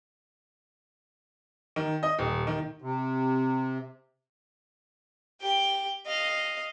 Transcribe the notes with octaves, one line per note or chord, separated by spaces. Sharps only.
D#3
D#5
D#1
D#3
C3
G4 G5
D#5 F5